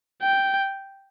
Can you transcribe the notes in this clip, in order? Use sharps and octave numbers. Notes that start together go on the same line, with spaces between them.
G5